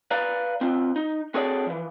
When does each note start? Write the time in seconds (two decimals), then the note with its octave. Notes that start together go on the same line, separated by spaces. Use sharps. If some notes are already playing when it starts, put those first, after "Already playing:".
0.11 B4 D5 F5 A#5
0.61 C4 C#4 F4
0.96 D#4
1.34 C4 F#4 G#4 A4 C#5 D5
1.67 E3 F3